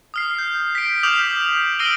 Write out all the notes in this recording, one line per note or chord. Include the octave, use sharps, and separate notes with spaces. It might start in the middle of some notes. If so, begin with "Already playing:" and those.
D#6 F6 C7
G6
B6 D7
D6 D#6 F6 G6 F7 F#7
E6 A#6 C7 D7 D#7 G7